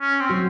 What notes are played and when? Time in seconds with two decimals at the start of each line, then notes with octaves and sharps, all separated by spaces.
0.01 C#4
0.20 C4
0.30 F#3 F#4